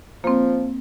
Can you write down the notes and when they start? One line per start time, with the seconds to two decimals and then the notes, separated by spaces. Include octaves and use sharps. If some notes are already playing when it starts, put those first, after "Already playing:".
0.24 F3 A#3 C4